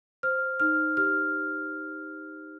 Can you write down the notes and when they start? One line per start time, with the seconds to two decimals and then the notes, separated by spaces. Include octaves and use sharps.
0.23 C5 F6
0.60 D#4 F6
0.97 G4 F6